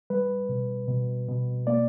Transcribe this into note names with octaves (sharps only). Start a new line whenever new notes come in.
G3 B4
B2
B2
B2
A#3 D5